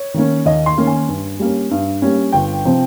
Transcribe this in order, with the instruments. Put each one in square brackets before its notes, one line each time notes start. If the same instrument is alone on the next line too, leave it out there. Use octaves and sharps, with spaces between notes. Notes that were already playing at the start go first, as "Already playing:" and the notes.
Already playing: [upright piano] C#5
D#3 A#3 C#4
D#2 D#5
C6
D#3 A#3 C#4
G#5
G2
G3 A#3 C#4
G2
G3 A#3 C#4
G1 G5
C3 F3 C4